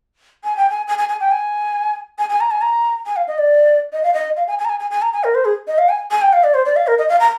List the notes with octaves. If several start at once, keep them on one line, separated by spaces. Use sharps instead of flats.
G#5
G5
G#5
G#5
G#5
G#5
G5
G#5
G#5
G#5
A#5
G#5
A#5
G#5
F5
D#5
D5
D#5
F5
D#5
F5
G#5
G#5
A#5
G#5
G#5
G#5
A#5
G#5
A#4
C5
G#4
D#5
F5
G#5
G#5
G5
F5
D5
C5
D5
F5
A#4
D#5
F5
A#5